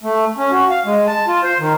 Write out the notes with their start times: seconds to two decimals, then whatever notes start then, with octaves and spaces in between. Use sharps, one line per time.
0.03 A3
0.38 C#4
0.51 F#4
0.70 F5
0.85 G#3
1.07 A5
1.27 F4
1.44 C5
1.59 D#3